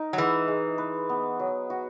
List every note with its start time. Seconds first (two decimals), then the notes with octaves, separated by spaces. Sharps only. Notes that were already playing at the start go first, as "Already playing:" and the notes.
Already playing: D#4 A#4
0.13 F#3
0.17 E3 G#3
0.48 G#3
0.78 B4
1.09 B3
1.39 F#3
1.70 F#4